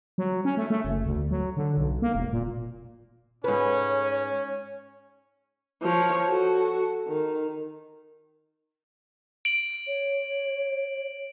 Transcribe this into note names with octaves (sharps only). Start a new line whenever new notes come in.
F#3
C#4
A3
A3
F#1
D2
F#3
D3
B1
A#3
E1
A#2
G#2 C#4 B4 C#5
F3 C#5
F#4 A4
D#3
D7 F#7
C#5